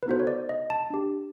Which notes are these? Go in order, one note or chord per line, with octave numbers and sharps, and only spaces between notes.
B4
B3 D#4 F#4 A4 C5
C#5
D5
D#5
A5
D4 G4